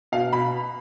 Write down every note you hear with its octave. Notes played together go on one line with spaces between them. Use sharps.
B2 F5
B2 B5